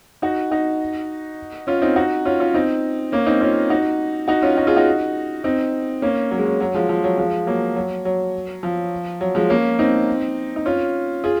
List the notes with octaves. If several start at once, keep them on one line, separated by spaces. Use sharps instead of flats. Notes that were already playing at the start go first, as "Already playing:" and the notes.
D#4 F#4
D#4 F#4
C#4 F4
C4 D#4
D#4 F#4
C#4 F4
C#4 F4
C4 D#4
A#3 C#4
C4 D#4
C#4 F4
D#4 F#4
D#4 F#4
C#4 F4
D#4 F#4
F4 G#4
D#4 F#4
C4 D#4
A#3 C#4
F#3
G#3
F#3
F#3
F3 G#3
F3
F#3
F3 G#3
F#3 A#3
F#3
F#3
F3
F#3
F3 G#3
A#3 C#4
C4 D#4
D#4
C#4 F4
F4 G#4